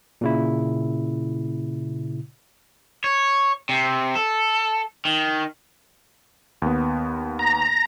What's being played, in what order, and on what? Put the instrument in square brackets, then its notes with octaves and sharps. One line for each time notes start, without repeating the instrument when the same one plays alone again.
[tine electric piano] A#2 C#3 E4
[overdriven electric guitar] C#5
C3
A4
D#3
[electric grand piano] D#2 B3
[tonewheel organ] A#5